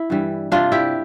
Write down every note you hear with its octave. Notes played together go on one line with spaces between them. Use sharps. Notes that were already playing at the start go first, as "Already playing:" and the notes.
Already playing: E4
G2 E3 G3
C3 G3 D4 F4
E4 G4